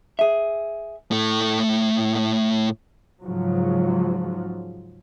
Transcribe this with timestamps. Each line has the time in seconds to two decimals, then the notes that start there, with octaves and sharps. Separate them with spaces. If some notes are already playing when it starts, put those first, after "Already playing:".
0.19 G#4 E5
1.11 A2 A3
3.23 G#2 C#3 F3 F#3